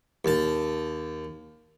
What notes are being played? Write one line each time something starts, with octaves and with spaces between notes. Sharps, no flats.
D#2 A5